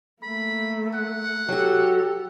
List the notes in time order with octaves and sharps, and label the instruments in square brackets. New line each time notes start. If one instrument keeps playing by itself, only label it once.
[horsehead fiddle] A3 A#3 [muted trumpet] B5
[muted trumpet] F#5
[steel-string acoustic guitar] F#3 F#4 [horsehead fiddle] G4 A4